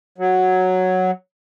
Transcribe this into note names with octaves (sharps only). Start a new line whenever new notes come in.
F#3